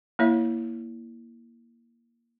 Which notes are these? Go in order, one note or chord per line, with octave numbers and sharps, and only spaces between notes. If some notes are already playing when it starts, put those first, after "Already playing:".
A#3 E4 C#5 E5